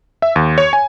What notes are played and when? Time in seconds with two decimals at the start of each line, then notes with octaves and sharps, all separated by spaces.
0.22 E5
0.36 D#2
0.58 C#5
0.73 G#5